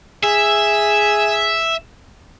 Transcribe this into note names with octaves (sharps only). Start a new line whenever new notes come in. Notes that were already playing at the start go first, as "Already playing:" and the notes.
G#4 E5